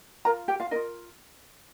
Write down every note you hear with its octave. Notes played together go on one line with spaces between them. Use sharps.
F4 A#4 A#5
G4 G5
F4 F5
D#4 F4 A#4 D#5